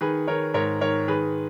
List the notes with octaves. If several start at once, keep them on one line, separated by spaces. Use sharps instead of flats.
D#3 G#4 B4
D#3 A#4 C#5
G#2 A#4 C#5
D#3 A#4 C#5
D#3 G#4 B4